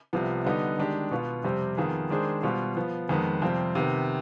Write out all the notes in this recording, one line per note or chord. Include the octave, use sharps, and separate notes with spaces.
C2 C3 F3 B3
D3 G3 B3 D#4
D#3 G#3 D4 G4
B2 B3 F4
F2 C3 G3 C4
F2 D#3 B3 F4 G#4
D#3 G#3 D4 G#4 C5
B2 G3 B3 F4 C5
F3 B3 F4
F2 D#3 G#3 B3
F2 C3 G3 C4 F4
C3 D#3 B3